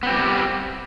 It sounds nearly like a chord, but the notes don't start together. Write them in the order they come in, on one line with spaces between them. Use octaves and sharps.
B3 C4 G3 G4